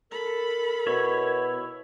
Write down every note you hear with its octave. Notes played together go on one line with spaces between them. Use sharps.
A4 A#4 B5
B2 E4 C#5